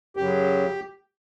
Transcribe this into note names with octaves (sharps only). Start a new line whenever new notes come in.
F#2 C#3 F#3 G4